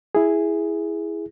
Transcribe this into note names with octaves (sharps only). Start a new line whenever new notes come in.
E4 G#4